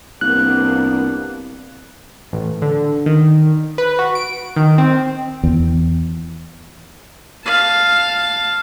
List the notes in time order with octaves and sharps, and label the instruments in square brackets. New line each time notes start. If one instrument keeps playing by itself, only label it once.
[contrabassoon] C2 [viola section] A#3 B3 D4 [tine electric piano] F#6
[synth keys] A1
D3
D#3
B4
F#4
D7
D#3
C4
[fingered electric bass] E2
[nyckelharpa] F5 A5